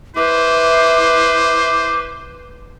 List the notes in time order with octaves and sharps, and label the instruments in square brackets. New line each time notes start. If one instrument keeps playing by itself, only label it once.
[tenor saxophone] E4 [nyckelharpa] B4 [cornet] C5 [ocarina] D6